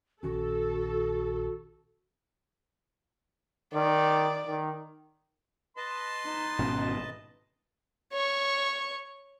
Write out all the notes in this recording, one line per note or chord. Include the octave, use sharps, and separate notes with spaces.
A#1 D#3 C#4 F#4 A4
D#3 D5
D#3
B4 D#5 A5 C6
D#4
G#1 B2 C#4
C#5 C#6